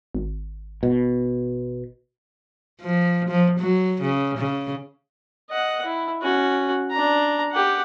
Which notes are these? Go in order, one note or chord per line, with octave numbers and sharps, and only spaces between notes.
G#1
B2
F3
F3
F#3
C#3
C#3
D#5 F#5
E4
C#4 F#4
D4 A#5
G4 F#5